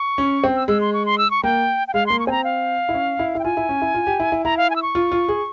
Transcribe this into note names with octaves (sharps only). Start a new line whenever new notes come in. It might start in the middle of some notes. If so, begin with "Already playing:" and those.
Already playing: C#6
C#4
C4
E6
G#3 E6
C6
C#6
C6
E6
C#6
A#3 G5
G5
G#3 F5
A#3 C6
C#6
C4 G#5 A#5
F5
E4
C#4
E4
E4 G5
F4 G#5
E4
C#4
E4
F4
G4
E4
E4
E4 A#5
F5
G#5
E6
C#6
F4
F4
G#4